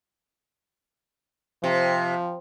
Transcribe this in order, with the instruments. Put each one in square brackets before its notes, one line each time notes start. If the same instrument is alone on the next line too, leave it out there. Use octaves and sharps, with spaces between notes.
[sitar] C3 [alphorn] F3